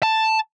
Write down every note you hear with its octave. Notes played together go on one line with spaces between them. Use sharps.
A5